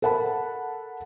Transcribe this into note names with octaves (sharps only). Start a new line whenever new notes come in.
A4 A#4 F#5 A5 B5